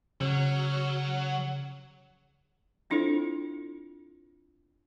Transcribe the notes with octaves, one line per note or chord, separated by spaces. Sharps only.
C#3 F#3 C#4
C4 D4 E4 F4 A4 C5